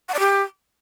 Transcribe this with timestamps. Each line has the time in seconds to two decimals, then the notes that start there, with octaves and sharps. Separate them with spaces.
0.09 F#5
0.14 D5
0.19 G4